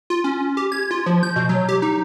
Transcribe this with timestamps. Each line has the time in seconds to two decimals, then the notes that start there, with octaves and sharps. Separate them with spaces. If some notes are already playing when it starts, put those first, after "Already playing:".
0.10 F4
0.24 C#4
0.57 G4
0.72 G#6
0.91 F4
1.06 F3
1.23 G6
1.36 B2
1.49 F#3
1.69 G4
1.82 D#4